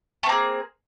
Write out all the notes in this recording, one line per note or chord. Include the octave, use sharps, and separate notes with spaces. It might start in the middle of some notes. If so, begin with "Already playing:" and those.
A3 A#3 C4 G#4